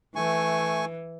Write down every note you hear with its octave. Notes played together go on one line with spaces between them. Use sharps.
E3 A3 G#5 C#6